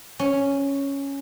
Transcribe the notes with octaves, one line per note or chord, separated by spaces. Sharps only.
C#4